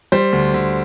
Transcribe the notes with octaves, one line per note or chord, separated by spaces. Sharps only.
G3 C5
D2
D2